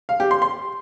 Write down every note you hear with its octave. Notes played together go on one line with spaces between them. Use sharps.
F5
G4
C6
C6